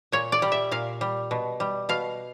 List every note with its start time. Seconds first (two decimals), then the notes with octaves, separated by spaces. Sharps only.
0.12 A#2 C#5
0.32 D5
0.42 G3
0.52 E5
0.71 A#2 F5
1.01 G3
1.31 B2
1.60 G3
1.89 B2 F5